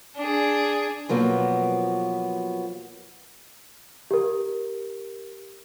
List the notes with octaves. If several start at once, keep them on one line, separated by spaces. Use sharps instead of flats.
D4 G#4
B2 F3 F#3 A#3 B3
G4 A#4